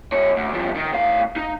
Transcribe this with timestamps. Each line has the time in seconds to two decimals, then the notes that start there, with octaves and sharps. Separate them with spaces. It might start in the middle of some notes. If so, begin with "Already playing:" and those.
0.13 G2 C#5
0.36 D2
0.53 G2 F3
0.75 D#3
0.93 A2 F5
1.36 D#4